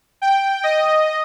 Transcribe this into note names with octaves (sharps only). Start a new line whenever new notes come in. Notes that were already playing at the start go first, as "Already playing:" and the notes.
G5
D#5